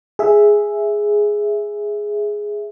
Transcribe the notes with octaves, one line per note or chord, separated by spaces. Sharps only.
G#4 E5